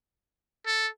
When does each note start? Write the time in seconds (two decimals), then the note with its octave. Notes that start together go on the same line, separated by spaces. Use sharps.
0.66 A4